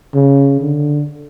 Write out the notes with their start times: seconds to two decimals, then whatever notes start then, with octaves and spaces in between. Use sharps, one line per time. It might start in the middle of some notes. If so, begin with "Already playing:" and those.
0.14 C#3
0.61 D3